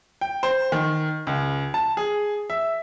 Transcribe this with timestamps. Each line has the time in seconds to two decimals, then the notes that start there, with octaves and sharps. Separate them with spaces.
0.21 G5
0.43 C5
0.72 D#3
1.27 C#2
1.74 A5
1.97 G#4
2.50 E5